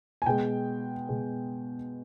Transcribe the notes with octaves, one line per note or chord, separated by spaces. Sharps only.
G#5
B2 G#3 G5
B2 G#3